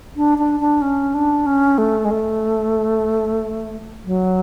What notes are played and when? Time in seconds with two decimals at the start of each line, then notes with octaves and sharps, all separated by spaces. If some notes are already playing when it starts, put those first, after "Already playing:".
0.16 D4
0.38 D4
0.60 D4
0.81 C#4
1.14 D4
1.46 C#4
1.78 A3
2.05 G#3
2.11 A3
4.06 F#3